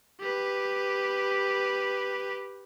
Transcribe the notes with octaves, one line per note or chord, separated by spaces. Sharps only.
G4 B4